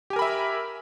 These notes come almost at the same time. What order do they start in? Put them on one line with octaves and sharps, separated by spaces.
G4 G#5 A#4 B5 E5